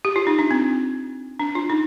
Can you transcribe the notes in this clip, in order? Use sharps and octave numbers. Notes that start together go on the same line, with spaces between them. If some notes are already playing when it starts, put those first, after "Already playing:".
G4
F4
D#4
D4
C4
D4
F4
D#4